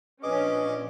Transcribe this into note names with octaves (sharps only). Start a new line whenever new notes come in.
A#2 F3 C#4 D4 G#4 B4 D#5 D6